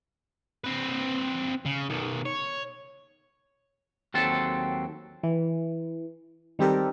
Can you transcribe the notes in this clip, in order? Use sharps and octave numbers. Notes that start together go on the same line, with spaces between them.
C4 B4
C#3
B1 D#3
C#5
D#2 F#3 C4 A4 A5
E3
D#3 G3 C4 G4 A4 A#4